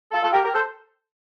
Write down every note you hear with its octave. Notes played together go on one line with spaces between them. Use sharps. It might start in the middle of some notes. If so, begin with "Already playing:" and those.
F4 A4
F4 A4
G4 A#4
G4 A#4
A4 C5